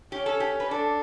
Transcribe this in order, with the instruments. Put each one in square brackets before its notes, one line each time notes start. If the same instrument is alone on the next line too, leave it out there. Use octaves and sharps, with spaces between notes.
[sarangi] C#4 [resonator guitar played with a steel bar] G4
[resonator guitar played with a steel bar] A4
G4
B4
[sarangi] D4 [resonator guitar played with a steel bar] A4